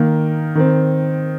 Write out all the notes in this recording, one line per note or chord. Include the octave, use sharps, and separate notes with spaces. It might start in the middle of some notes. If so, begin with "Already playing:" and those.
Already playing: D#3 A#3
D#3 C4